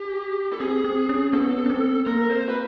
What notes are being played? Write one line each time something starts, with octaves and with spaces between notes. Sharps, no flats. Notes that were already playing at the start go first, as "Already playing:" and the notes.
Already playing: G4
A4
C4 G#4
C4
C#4
B3 A4
C#4
C4
A#3 A#4
C5
B4